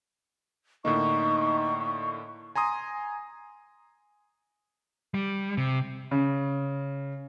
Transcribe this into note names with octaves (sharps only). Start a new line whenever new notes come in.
A2 D3 A#3 D#4 C#6
G#5 A#5 C6 D#6
G3
C3
C#3